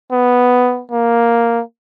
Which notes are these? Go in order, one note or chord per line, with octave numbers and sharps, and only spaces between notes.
B3
A#3